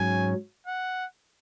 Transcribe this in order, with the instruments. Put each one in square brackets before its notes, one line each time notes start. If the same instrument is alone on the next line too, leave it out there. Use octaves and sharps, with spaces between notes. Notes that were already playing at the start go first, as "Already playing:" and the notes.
Already playing: [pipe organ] G#2 F#3 C#4 [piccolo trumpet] G#5
[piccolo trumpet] F#5